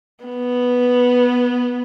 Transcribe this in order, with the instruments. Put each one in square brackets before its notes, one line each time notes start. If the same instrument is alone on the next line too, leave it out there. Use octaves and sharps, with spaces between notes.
[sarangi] B3